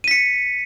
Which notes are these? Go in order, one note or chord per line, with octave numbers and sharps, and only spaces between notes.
B6 C#7 D#7